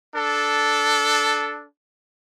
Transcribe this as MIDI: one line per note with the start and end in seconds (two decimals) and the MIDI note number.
0.15 1.66 62
0.15 1.66 69